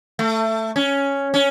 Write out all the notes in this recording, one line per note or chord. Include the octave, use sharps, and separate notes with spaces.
A3
C#4
C#4